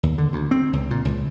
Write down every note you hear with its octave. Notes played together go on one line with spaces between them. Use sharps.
D#2
D3
D2
C4
C#2
A#2
C#2